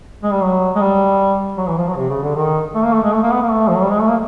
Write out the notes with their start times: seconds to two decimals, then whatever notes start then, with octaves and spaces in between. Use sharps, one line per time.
0.23 G#3
0.32 G3
0.43 F#3
0.76 G#3
0.81 G3
1.58 F#3
1.67 E3
1.78 F3
1.87 F#3
1.97 C3
2.09 C#3
2.22 D3
2.36 D#3
2.75 A3
2.85 A#3
2.93 A3
3.03 G#3
3.13 A3
3.22 A#3
3.32 B3
3.42 A#3
3.51 A3
3.68 F3
3.75 F#3
3.83 G3
3.90 G#3
4.00 A3
4.09 A#3